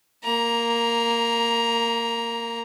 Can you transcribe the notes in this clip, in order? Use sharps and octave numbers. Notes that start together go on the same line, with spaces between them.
A#3 A#5